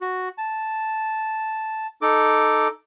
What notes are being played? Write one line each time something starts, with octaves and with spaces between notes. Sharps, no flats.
F#4
A5
D#4 A4 D6